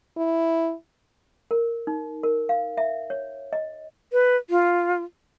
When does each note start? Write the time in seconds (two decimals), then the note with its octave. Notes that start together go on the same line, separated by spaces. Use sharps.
0.17 E4
1.51 A#4
1.87 D#4
2.23 A#4
2.49 F5
2.77 E5
3.10 C#5
3.53 D#5
4.13 B4
4.50 F4